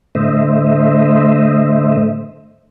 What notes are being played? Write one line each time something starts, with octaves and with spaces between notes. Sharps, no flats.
A2 D3 A3 C5 D#5 E5